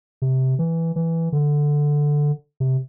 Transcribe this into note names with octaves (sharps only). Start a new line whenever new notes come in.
C3
E3
E3
D3
C3